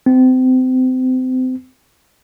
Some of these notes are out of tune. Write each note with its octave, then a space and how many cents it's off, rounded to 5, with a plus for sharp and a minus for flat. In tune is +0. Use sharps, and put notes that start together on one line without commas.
C4 -30